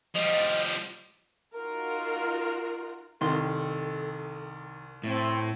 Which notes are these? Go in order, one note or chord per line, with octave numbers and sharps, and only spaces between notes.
F3 G3 D#5
D#4 F4 F#4 A#4
C2 D#3 A4 C6
A2 C4